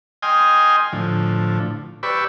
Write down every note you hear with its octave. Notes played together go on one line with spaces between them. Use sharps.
D#5 G5 G#5 C6 D#6 F6
A2 D3 F3
G4 B4 D5 B5 C#6 E6